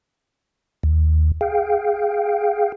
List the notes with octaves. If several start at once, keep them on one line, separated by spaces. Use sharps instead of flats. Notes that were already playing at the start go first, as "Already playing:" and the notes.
D#2
G#4 F5 G5